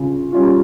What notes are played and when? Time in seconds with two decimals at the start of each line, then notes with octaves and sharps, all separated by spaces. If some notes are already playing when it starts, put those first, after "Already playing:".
Already playing: C#3 C#4 F4
0.32 G3 C#4 F4